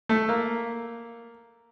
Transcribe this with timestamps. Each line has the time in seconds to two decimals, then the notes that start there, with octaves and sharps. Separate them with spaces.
0.09 A3
0.29 A#3